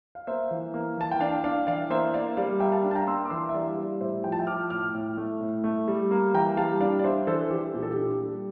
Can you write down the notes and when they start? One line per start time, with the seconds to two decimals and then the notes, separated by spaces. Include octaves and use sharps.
0.15 F5
0.27 A#3 C5 E5
0.51 E3
0.74 A#3
0.97 E3 A5
1.11 G5
1.20 D4 D5 F5
1.44 D4 D5 F5
1.67 E3 D5 F5
1.90 A#3 C5 E5
2.14 A#3 D5 F5
2.37 G3 D5 F5
2.60 A#3 E5 G5
2.72 F5 A5
2.84 D4
2.91 A5
2.95 G5 A#5
3.07 A#3 C6 E6
3.25 D6
3.30 E3 C6 E6
3.49 E5
3.53 G3 D5 F5
3.77 G3
4.00 A2 C5 E5
4.24 F3 G5
4.32 A5
4.39 E5 G5
4.47 F3 D6 F6
4.70 A2 D6 F6
4.94 A2
5.17 A3
5.40 A2
5.64 A3
5.88 G3
6.11 A#3
6.34 E3 G5 A#5
6.57 G3 F5 A5
6.80 D4 D5 F5
6.99 D5
7.04 D4 C5 E5
7.27 E3 A4 C5
7.50 E3 G4
7.74 A#2 G4
7.83 A4
7.91 G4
7.97 D4
8.21 G3